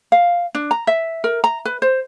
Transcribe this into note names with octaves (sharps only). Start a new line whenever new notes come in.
F5
D4
A#5
E5
A#4
A#5
B4
C5